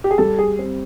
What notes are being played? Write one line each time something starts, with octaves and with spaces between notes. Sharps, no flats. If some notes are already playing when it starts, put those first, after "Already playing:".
G4
G#4
G3 A4
G#4
C4